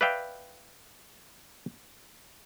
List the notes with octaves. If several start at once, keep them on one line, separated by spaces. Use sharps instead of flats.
B4 D5 E5 F5 G5